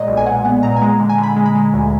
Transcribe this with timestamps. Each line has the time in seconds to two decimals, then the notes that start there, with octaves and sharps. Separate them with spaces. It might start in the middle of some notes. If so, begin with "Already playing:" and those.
Already playing: A#2 G#3 D5 D#5
0.08 B1
0.17 G#5
0.26 A#2 F#5
0.45 B3 F#5
0.63 A#2 A#5
0.76 G#5
0.82 G#3 A#5
1.00 D3
1.09 G#5
1.18 D3
1.23 B5
1.36 G#3
1.46 B5
1.55 G#3
1.73 D2